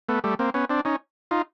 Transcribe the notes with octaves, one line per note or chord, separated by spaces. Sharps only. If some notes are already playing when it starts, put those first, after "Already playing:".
A3 B3
G3 A3
A#3 C4
B3 C#4
C4 D4
C#4 D#4
D#4 F4